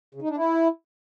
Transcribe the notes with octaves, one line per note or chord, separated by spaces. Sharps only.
C#3
D#4
D4
E4